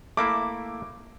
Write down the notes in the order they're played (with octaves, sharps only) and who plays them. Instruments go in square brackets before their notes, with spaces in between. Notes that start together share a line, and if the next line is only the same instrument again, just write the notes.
[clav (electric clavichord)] A3 A#3 E4 [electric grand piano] D6